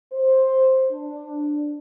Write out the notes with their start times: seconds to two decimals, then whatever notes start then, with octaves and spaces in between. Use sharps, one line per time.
0.13 C5
0.91 D4